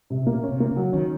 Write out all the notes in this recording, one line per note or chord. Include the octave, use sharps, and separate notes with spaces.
C3
A#2 A#3
C#4
C3
A#3
C#3
F#3
D#3 C#4